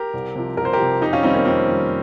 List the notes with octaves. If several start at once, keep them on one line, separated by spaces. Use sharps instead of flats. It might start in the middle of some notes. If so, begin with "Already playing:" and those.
Already playing: G4 A#4
C2
C3 F3
C2 A#4
C5
G4 A#4
C3 F3
F2 D#4 G4
C#4 F4
D#3 G3 C4 D#4
A#3 C#4
F2 C4
D#3 G3